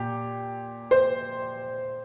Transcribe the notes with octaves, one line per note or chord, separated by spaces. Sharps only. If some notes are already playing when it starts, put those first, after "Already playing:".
Already playing: A#2 G4
C5